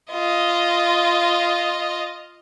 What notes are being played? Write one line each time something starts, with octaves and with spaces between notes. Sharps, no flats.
F4 D#5